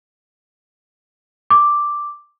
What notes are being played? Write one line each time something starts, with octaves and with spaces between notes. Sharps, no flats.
D6